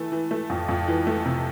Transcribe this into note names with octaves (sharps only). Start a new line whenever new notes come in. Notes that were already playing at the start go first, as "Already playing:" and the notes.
Already playing: E3 A3
E3
A3
F2
F2
E3
A3
C3